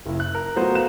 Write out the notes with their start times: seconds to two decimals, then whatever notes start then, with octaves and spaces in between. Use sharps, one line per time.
0.06 F#1 E4
0.20 F#6
0.35 A#4
0.56 F#3 A3 B3 F4 F#4 C5
0.75 F5 A#5 F#6 E7